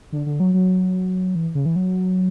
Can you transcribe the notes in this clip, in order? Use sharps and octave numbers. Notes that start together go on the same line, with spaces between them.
D3
D3
F#3
F#3
E3
C#3
E3
F#3